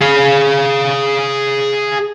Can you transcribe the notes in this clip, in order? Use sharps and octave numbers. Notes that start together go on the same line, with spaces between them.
G#4 F5